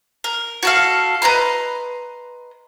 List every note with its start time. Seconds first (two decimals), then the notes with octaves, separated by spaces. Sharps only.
0.24 A#4
0.63 F#4 A4 F5
1.22 B4 D#5 A#5 C6